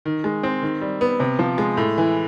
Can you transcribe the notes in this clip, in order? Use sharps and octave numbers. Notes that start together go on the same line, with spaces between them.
D#3
G#3
C4
D#3
G3
B3
C3
F3
G#3
A2
E3